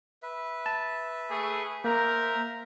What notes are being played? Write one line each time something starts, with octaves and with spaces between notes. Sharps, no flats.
B4 E5
A5
A3 G#4
A#3 A#4 C5 E5 A#5